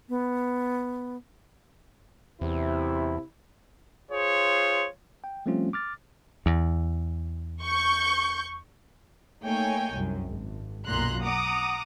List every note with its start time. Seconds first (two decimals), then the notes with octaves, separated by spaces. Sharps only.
0.09 B3
2.41 E2 C3 E4
4.11 F4 G#4 C5 C#5
5.24 G5
5.46 F3 G3 A3 C4 C#4 F4
5.73 D6 F6 A6
6.46 E2
7.63 C#6 G6
9.44 A3 A#3 D#4 C#5 G5 G#5
9.94 C2 F#2
10.29 G#1
10.86 B1 F#2 A#2 A#5 C6 F#6
11.22 F#5 A#5 D6 D#6